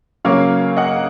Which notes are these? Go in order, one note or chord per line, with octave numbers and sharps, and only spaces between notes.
C#3 F#3 A#3 C#5 F5
D#5 F#5